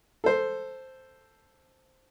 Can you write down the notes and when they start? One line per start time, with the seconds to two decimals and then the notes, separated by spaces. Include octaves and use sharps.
0.24 A4 C5